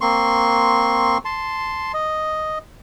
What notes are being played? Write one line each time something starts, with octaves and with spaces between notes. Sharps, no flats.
A#3 C4 C6 C#6
A5 C6
D#5